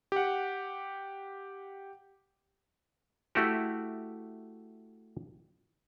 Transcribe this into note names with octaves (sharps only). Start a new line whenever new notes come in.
G4 F#5
A3 E4 F#4 G4